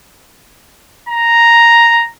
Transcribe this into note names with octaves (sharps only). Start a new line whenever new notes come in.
A#5